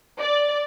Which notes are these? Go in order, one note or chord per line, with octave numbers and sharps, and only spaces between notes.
D5